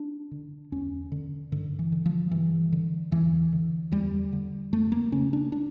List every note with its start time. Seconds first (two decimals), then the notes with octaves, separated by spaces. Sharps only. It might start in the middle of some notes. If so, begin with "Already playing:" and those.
Already playing: D4
0.31 D3
0.72 E2 C#4
1.12 D3
1.52 G2 D3
1.79 E3
1.92 D3
2.06 F3
2.31 G2 E3
2.72 D3
3.11 E2 E3
3.52 D3
3.92 E2 G3
4.32 D3
4.72 F2 A3
4.92 A#3
5.12 C#3 C#4
5.33 D4
5.52 D4